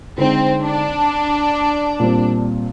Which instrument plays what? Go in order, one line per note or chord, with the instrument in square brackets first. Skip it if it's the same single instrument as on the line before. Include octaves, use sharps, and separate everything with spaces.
[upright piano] D3 G#3 D#4 [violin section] C4
[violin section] D4
[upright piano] A#2 G3 C4